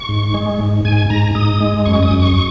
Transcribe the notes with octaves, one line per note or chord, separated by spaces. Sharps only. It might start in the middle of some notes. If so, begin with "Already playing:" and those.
Already playing: C#6
G#2
G#3
G#2
G#2 G#5
G#2 A#5
G#2 D#6
G#3
F#2 C#6
D#6
F#2
C#6